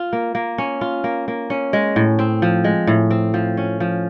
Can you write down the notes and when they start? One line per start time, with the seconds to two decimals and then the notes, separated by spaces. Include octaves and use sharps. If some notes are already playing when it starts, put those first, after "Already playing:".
Already playing: F4
0.13 A#3
0.35 A#3
0.58 C#4
0.81 F4
1.04 A#3
1.28 A#3
1.50 C#4
1.73 G#3
1.96 A2
2.19 C4
2.42 F3
2.64 G#3
2.87 A2
3.11 C4
3.34 F3
3.57 C#4
3.80 F3